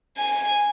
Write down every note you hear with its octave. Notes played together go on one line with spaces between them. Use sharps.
G#5